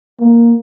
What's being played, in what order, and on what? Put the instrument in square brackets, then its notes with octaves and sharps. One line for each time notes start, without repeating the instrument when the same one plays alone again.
[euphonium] A#3